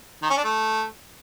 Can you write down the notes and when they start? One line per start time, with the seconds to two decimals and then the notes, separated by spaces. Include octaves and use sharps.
0.22 D#3
0.30 C#4
0.37 D4
0.44 A3